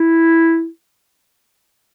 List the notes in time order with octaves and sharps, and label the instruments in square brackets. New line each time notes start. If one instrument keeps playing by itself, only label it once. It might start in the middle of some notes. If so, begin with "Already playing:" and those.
Already playing: [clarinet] E4